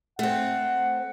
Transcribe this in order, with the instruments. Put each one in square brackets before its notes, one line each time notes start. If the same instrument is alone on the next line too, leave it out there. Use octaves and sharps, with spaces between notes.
[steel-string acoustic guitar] A3 C4 [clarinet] F#5